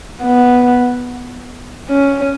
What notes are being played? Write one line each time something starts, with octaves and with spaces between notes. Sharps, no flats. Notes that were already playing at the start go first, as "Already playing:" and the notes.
B3
C#4